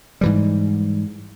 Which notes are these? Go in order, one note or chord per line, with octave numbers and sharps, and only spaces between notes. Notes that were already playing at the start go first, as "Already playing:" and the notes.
G#2 E3 G3